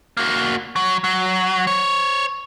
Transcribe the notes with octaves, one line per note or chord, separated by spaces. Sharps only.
A#3 F#4
F#3
F#3
C5 C#5